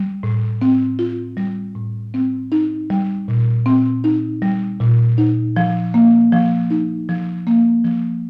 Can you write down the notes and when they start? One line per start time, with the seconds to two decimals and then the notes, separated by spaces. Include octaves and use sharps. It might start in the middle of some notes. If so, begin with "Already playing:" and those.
Already playing: G3
0.23 A2
0.62 C4
0.99 F4
1.37 G3
1.75 A2
2.14 C4
2.52 D#4
2.90 G3
3.28 A#2
3.66 C4
4.04 D#4
4.42 G3
4.80 A#2
5.18 D#4
5.57 F3
5.94 A#3
6.33 F3
6.71 D#4
7.09 F3
7.47 A#3
7.85 F3